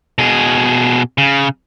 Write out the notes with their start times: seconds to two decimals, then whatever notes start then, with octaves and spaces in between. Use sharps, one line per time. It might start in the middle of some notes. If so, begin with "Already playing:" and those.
0.18 B2 G#4
1.18 C#3